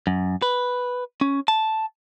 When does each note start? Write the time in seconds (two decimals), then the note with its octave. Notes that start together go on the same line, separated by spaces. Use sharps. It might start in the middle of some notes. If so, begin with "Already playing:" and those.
0.07 F#2
0.42 B4
1.21 C#4
1.48 A5